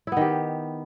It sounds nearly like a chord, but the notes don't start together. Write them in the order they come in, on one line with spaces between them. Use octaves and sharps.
E4 B3 D#3 G4